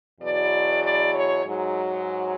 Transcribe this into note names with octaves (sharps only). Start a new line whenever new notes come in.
E2 B2 F#3 D5
D5
C#5
G#2 F#3